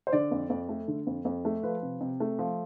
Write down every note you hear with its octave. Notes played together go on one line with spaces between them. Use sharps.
C5
D3 D5
F2
F2
A3
D3
F2
F2
A3
F3 B4
C3
C3
A3
F3